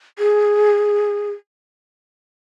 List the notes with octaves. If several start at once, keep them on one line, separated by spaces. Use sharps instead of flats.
G#4